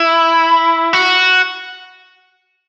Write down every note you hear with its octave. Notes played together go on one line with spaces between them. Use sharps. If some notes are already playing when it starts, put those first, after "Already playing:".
Already playing: E4
F#4